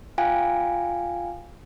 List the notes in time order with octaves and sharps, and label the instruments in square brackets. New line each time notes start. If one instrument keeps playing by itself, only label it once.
[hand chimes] F4 F5 G5 G#5